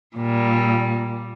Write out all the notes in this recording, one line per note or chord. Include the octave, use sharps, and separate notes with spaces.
A#2 G3